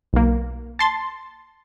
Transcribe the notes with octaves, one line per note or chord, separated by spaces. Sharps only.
B1 A#3
A5 C6 A6